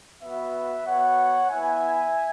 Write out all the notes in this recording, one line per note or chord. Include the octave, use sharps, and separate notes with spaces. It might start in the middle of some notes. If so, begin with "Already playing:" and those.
B3 F#4 B4 E5
B3 F#4 C#5 F#5
B3 E4 E5 G#5